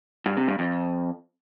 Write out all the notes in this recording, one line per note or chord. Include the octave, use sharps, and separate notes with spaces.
G2
C3
G2
F2